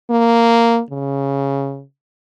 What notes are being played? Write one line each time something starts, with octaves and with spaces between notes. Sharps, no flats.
A#3
C#3